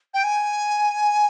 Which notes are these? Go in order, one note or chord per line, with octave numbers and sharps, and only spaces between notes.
G5
G#5